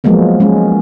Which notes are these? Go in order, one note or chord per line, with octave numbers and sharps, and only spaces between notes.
F3 F#3 G#3 A#3 B3
G#3 C#4